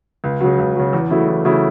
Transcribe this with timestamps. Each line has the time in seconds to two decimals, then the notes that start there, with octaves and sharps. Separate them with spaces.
0.24 C#2
0.41 C#3 F#3
0.59 C#2
0.76 C#3 F#3
0.93 E2
1.10 C#3 F#3 A3 E4
1.28 E2
1.45 C#3 F#3 A3 E4